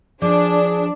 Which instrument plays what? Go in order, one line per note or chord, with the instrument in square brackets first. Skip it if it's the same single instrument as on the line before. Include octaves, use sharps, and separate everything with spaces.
[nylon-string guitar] F3 [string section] D4 [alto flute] G#4 [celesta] D5 D6